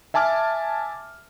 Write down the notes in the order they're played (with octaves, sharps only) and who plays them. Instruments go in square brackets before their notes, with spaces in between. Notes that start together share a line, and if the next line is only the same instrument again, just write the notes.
[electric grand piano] E5 G#5 A5 D6 F6